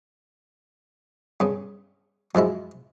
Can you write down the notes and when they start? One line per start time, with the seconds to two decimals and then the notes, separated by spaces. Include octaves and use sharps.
1.40 G2 C#3
2.35 F#2 F3 G#3 E4